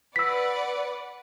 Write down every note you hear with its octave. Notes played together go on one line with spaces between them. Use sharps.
B4 D5 F#5 E6 B6